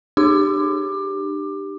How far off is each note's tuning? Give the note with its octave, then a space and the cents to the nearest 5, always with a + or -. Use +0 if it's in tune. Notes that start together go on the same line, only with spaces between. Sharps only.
D4 +45 G4 +0 D6 +20